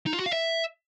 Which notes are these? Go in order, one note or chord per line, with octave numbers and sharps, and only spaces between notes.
D#4
F4
F#4
F5
E5